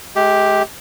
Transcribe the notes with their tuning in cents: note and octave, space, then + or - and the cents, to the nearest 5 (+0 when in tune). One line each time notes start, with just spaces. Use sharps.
G#3 +35 G4 +0